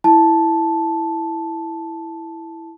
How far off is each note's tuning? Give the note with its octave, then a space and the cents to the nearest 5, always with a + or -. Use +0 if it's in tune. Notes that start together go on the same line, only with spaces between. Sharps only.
E4 +0 A5 -5